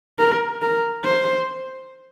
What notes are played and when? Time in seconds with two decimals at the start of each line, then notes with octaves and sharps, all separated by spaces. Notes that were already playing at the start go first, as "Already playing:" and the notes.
0.19 A#4
0.62 A#4
1.04 C5